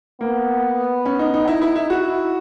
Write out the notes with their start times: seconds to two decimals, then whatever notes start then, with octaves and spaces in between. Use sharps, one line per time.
0.21 A#3 B3
1.05 C#4
1.19 D#4
1.34 D#4
1.47 D#4 E4
1.62 E4
1.76 E4
1.90 E4 F#4